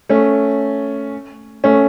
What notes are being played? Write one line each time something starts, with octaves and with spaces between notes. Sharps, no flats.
A3 C#4
A3 C#4